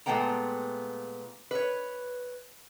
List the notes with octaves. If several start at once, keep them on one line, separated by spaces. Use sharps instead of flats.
A#2 G#3 A3 B3 G5 A#5
B4 C#5